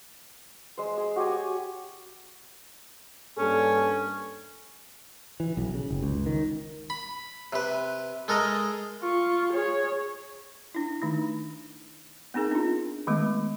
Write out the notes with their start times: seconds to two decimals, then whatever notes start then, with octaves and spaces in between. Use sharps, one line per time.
0.78 G#3 C5
0.97 G#4
1.16 F#4 G4 C#5 G#5
3.38 G2 A#3 C#4 A4
5.40 E3
5.57 B1
5.74 C#3
5.91 F#1
6.02 C#2
6.26 D#3
6.90 B5
7.53 C3 B4
8.28 G#3 A4 A#4 D#5
9.02 F4 C#6
9.52 G#4 C#5
10.75 D4 E4
11.02 D#3 A3 D#4
12.34 B3 C4 D#4 G#4 A#4
12.51 D4 F4
13.07 D#3 G#3 A3 B3